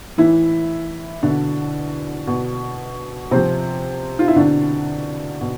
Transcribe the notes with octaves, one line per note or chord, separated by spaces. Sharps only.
A2 E3 E4
B2 D3 D4
B2
C3 F3 C4
F4
E4
B2 D3 D4
B2